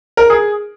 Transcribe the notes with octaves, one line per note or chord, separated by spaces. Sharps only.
A#4
G#4